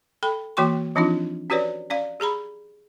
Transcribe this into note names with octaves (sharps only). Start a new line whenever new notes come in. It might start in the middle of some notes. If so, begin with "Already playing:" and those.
A4 G5 B5
E3 A#3 F#4 G5 C6 C#6
E3 F3 C4 D4 D#4 F4
C#4 F#4 G4 B4 C#5 D5
C#4 D5 F5
G4 G#4 A#5 B5